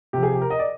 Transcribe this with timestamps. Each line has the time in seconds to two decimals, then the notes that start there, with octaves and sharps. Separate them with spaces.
0.13 C3 F3 G4
0.23 G#4
0.32 G4
0.42 A#4
0.50 D#5
0.59 D5